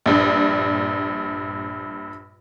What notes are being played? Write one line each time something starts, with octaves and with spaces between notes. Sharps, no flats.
A#1 G2